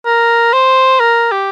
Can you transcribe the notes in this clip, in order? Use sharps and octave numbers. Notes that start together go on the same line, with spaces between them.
A#4
C5
A#4
G4